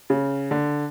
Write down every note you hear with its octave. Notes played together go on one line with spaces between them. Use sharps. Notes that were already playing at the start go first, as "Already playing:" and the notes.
C#3
D3